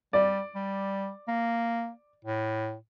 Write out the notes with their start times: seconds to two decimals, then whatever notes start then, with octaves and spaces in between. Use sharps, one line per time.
0.13 G3 D5
0.55 G3
1.28 A#3
2.25 A2